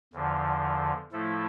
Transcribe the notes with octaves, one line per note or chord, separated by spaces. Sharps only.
E2 D3 F3
A2 F3 A3 E4 A4